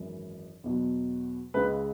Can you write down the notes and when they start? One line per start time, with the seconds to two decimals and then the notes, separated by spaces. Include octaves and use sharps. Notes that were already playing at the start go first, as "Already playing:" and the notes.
Already playing: G#1 F#2 E3
0.64 E2 B2 F#3
1.54 C#2 C#3 G#3 B4